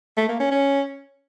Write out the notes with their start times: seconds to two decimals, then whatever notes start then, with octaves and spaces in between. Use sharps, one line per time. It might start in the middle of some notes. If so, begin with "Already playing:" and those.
0.17 A3
0.29 A#3
0.40 C#4
0.51 C#4